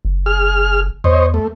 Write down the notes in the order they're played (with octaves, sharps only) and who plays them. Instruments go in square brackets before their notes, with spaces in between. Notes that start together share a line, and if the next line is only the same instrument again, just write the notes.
[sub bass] F#1
[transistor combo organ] G#4 F6
[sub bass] E2 [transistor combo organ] C5 C#5 D#5
[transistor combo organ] A3